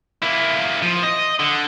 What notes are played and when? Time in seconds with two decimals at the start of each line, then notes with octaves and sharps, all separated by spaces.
0.22 A#3 E4
0.82 F3
1.03 D#5
1.40 D3